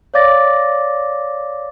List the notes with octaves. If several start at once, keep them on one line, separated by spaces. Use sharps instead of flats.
C#5 D5 F5 D6 A6 A#6